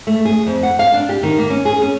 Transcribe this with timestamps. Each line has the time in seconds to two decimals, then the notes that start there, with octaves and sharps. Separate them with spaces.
0.07 A3
0.25 G#4
0.46 F2
0.63 F#5
0.79 F5
0.93 D4
1.09 G4
1.23 D#3
1.39 A#3
1.50 C#4
1.65 G#4
1.82 C#4